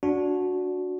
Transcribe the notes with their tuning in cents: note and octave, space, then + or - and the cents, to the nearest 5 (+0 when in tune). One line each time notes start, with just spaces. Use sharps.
D4 -15 F#4 -15